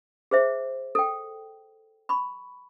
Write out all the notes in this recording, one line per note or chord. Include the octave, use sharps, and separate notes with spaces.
G#4 C5 E5
A4 G5
B5 C#6